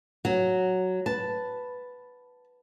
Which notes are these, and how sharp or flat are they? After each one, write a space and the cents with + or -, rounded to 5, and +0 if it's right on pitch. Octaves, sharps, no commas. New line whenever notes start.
F#3 +0 F#5 +0
B4 +5 A5 +0